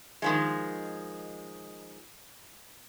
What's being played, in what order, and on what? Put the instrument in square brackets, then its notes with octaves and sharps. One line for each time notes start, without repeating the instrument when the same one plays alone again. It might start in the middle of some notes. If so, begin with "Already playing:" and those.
[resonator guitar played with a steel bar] D#3 F3 G#3